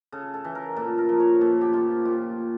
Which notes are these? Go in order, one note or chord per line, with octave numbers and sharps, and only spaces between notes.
C#3 A4
A4
E3
A#4
A#2 A4
A#4
F3
C#5
A#2 A4
G4
F3 F4
A#2 F4